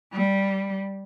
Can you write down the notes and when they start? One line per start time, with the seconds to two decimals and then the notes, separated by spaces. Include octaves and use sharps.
0.13 G3